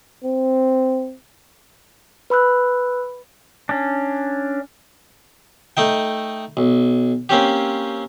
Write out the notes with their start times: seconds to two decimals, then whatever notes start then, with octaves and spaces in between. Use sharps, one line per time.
0.24 C4
2.30 B4 B5 E6 F#6
3.69 C#4 D4
5.77 A3 D#4 G5
6.57 B1
7.29 A#3 C4 C#4 G4